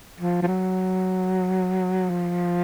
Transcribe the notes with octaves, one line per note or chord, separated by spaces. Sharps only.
F3
F3
F#3
F3